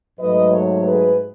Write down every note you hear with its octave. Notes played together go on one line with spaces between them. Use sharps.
G#2 F#3 A3 B4 D#5
A4 C#5
G#4 B4